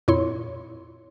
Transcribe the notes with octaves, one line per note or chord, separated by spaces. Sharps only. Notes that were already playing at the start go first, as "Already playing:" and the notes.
F2 A#2 E4 C#5 C6